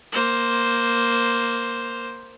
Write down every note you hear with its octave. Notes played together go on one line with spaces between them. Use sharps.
A#3 C5